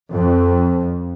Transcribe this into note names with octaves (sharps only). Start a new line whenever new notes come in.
F2